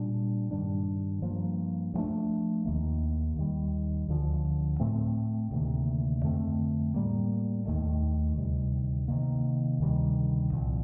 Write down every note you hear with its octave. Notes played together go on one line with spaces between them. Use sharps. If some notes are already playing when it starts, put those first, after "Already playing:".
Already playing: A#2 G3 D4
G2 D#3 G3 D4
G2 F3 A#3
G2 F3 A3 D4
D#2 D#3 A#3
D#2 D#3 G3
D2 D3 F3
A2 A3 C4
D2 C3 D#3 A#3
F2 D3 A3 C4
A2 G3 A#3
D#2 D#3 A3
D2 C3 D#3 G3
C3 D#3 A#3
D2 C3 D#3 G3
C2 A#2 F3 C4